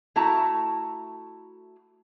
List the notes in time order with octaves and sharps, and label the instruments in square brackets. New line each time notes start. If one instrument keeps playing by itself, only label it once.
[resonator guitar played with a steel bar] A3 E4 F#4 A5 A#5